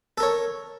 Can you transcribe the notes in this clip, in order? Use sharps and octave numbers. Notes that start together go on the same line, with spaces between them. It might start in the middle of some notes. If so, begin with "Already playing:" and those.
A4 A#4 C#5